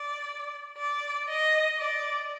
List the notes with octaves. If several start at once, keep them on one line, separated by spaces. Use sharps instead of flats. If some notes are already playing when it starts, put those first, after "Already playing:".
Already playing: D5
D5
D#5
D5